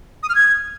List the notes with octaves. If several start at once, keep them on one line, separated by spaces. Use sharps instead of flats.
D#6
F6
G#6